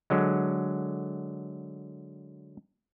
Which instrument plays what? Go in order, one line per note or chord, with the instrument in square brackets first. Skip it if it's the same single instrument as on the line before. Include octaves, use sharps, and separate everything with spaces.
[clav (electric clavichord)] D3 F#3 G#3